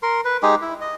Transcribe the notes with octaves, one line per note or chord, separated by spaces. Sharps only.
A#4 C6
B4
G#3 D#4 G4 G#4
E4
D#5